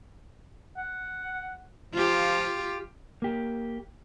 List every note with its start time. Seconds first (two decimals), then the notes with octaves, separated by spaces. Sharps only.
0.77 F#5
1.94 F3 F4 G4
3.22 A#3 G4